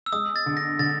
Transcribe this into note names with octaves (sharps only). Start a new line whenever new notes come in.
E6
G#3 D#6
A6
D3
A#6
D3 A6